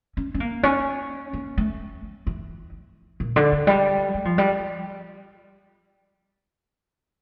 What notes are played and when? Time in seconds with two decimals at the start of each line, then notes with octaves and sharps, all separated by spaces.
0.17 C#4
0.34 C#4
0.40 A#3
0.63 C#4
1.33 A#3
1.58 A3
2.27 E3
3.20 A#2
3.36 D3
3.52 E3
3.67 G3
4.14 A3
4.25 F3
4.38 G3